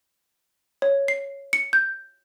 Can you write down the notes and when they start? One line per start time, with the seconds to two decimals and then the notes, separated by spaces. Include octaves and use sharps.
0.82 C#5
1.08 C7
1.53 C#7
1.73 G6